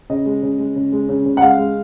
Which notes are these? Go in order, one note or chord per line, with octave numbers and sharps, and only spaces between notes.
C#3 D#5
G#3
C#3
G#3
C#3
G#3
C#3
C#3
F#5
G#3 F5
G#3